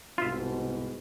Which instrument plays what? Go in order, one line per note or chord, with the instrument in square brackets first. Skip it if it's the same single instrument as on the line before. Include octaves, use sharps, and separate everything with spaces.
[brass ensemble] C2 G#2 B2 [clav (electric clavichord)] F4 E5